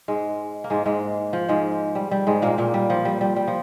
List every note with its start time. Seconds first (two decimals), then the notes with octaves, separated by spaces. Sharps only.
0.08 G#2 G#3
0.64 A#3
0.70 G#2 G#3
0.86 G#2 G#3
1.33 F3
1.49 G#2 G#3
1.95 G3
2.11 G3
2.27 G#2 G#3
2.42 A#2 A#3
2.58 A#2 A#3
2.74 G3
2.90 F3
3.05 G3
3.21 G3
3.36 G3
3.48 F3